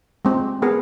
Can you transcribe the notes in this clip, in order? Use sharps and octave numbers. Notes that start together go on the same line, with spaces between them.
G#3 C4
B3 G#4 A#4